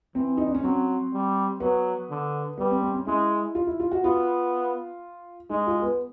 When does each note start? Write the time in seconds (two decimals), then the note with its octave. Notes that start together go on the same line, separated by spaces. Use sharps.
0.15 E3 C4
0.37 D#4
0.47 D4
0.55 C#4
0.63 F#3 C4
1.13 G3
1.60 F#3 B3
2.10 D3
2.58 G3 B3
2.71 C4
2.83 C4
2.94 C#4
3.07 G#3 E4
3.55 F4
3.67 E4
3.80 F4
3.91 F#4
4.04 B3 F4
5.50 G#3 D#4
5.67 F4
5.82 B3